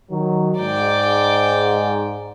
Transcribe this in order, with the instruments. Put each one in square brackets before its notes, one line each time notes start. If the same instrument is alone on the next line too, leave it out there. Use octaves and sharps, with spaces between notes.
[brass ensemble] D#3 F#3
[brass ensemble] G#2 [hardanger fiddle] D5 G5